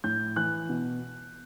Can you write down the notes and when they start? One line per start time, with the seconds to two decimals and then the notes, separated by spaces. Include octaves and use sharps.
0.04 A2 G6
0.36 E3 F#6
0.69 B2